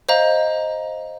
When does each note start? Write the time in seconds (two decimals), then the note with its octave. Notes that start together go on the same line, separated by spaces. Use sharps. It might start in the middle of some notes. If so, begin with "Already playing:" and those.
0.09 C5 D#5 F5 A#5